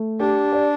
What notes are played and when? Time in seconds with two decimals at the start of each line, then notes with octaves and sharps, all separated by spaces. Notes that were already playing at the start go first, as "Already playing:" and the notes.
Already playing: A3
0.20 D4 G4
0.53 D5